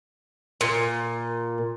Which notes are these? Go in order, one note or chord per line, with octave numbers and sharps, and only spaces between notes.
A#2